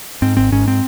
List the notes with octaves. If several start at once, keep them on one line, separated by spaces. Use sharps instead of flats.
G#2 C4
G#1 C4
G#2 C#4
C4